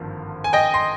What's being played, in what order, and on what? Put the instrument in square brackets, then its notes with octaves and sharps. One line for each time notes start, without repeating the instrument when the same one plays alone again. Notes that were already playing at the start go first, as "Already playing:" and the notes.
Already playing: [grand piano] G#1 G2 D3 F3 A#3
G#5
D#5 G5
C6